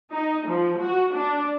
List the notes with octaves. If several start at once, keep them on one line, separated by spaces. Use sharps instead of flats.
D#4
F3
F#4
D4